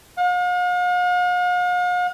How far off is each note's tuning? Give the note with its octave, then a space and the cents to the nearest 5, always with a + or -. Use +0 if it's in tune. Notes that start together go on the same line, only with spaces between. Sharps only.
F5 +45